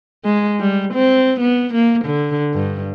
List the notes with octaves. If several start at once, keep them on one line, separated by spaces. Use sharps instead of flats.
G#3
G3
C4
B3
A#3
D3
G2